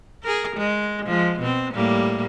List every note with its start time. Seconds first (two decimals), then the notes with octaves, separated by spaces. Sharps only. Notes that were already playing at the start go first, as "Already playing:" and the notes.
0.23 G#4 A#4
0.57 G#3
1.06 F3 G#3
1.40 B2 C4
1.73 A2 G3 A#3